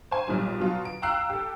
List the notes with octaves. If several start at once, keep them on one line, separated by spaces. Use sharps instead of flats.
C5 G#5
B1 A#2 G3
B2 F#3 F4
D7
F5 G5 A#5 E6 F#6 C7
G4 A4